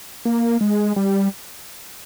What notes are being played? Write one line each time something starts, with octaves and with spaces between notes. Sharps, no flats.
A#3
G#3
G3